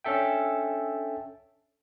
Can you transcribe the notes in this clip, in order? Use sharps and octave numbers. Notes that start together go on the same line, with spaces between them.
C#4 D4 A4 E5 G5